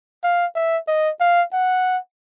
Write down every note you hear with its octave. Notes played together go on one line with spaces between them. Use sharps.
F5
E5
D#5
F5
F#5